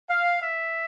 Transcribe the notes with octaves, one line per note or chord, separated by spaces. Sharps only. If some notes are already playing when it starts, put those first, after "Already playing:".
F5
E5